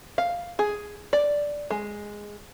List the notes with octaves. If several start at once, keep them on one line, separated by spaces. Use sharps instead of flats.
F5
G#4
D5
G#3